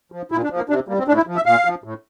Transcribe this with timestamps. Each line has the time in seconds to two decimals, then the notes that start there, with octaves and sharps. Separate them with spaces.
0.12 F3
0.32 A#2 E4
0.44 D4
0.50 F3
0.57 A#3
0.69 C3 D4
0.88 G3 A#3
0.98 C4
1.08 A2 D4
1.17 E4
1.27 F3
1.36 E5
1.46 A#2 F5
1.65 F3
1.84 A2